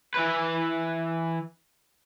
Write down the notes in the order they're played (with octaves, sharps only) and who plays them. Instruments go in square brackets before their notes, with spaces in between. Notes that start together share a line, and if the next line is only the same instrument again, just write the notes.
[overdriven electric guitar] E3 B4